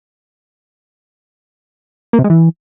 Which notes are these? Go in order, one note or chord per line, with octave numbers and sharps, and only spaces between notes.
A#3
C3
G#3
E3